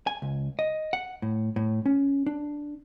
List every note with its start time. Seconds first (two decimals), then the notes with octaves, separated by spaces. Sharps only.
0.07 G#5
0.22 C#2
0.59 D#5
0.93 F#5
1.22 A2
1.56 A2
1.86 C#4
2.26 D4